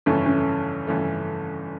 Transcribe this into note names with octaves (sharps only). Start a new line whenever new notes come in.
G1 F2 C#3 E3 A3 C#4
C#4
G1 F2 C#3 E3 A3